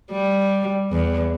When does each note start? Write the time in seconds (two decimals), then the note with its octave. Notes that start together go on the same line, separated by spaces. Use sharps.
0.11 G3
0.91 E2